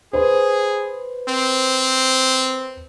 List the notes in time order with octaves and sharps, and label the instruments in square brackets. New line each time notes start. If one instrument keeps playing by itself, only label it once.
[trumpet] G#4 [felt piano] B4 C5
[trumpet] C4